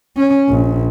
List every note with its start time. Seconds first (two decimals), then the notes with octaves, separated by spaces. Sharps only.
0.17 C#4
0.49 A#1